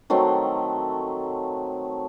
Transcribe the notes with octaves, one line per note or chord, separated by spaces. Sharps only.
D#3 F#3 A3 C4